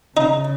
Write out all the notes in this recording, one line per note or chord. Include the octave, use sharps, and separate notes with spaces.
C#3 D#4